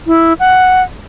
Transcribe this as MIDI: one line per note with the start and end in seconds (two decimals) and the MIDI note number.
0.07 0.33 64
0.39 0.82 78